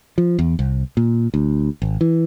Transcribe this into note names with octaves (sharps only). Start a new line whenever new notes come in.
F3
E2
C2
A#2
D2
G#1
E3